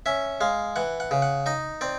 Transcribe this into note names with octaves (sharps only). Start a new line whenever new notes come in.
C#4 E5
G#3 F5
E3 F#5
F#5
C#3
F#5
D#4 D#5
C4 D5